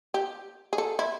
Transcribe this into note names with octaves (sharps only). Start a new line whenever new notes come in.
G4
G#4
A4
E4